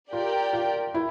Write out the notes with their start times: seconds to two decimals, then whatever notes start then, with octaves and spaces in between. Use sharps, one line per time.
0.12 F4 G4 A#4 D5 G5
0.53 F4
0.94 E4